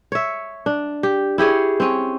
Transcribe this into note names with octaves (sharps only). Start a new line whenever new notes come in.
C#5 E5
D4
G4
E4 G4 G#4 C#5
C4 C#4